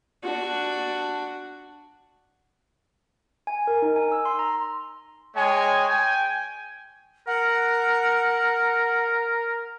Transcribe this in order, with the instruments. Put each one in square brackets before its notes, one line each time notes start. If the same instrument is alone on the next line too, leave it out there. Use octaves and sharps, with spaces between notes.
[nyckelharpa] D4 F#4
[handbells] G#5
A#4
D#4
G#5
E6
C6
A#5
[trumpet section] G#3 C#5 G5 G#5
G5 G#5
[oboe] A#4 [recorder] F#5